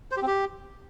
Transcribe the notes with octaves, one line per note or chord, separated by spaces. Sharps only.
C5
G4
C4
G4